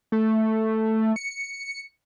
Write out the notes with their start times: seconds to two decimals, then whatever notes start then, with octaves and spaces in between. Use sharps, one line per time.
0.12 A3
1.16 C#7